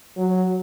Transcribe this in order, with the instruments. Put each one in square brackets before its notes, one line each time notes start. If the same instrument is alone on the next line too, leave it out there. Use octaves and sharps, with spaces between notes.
[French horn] F#3